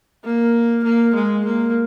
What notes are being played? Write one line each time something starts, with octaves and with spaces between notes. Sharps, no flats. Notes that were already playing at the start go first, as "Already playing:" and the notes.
A#3
A#3
G#3
A#3